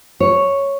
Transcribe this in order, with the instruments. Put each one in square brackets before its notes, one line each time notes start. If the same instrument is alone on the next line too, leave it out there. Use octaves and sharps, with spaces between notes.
[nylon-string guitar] C#5